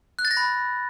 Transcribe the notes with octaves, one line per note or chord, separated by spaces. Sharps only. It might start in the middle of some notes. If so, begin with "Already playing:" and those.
F#6
A6
A#6
B5